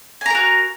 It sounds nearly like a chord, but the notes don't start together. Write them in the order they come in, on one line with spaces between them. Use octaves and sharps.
G#5 A#5 A#4 F#4